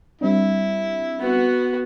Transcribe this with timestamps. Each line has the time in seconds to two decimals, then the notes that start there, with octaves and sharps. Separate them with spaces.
0.21 G3 C4 D4 E4
1.19 B3 F#4